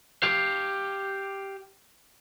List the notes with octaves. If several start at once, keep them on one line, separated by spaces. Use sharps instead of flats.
G4 F5